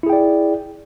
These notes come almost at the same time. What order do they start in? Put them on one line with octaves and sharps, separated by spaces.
E4 G#4 G5 D5